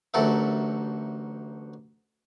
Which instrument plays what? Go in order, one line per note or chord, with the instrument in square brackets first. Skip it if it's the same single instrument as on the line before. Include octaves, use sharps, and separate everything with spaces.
[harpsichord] A1 D2 F#3 A4 A#4 E5